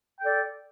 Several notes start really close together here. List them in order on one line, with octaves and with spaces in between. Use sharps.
G5 A4 D5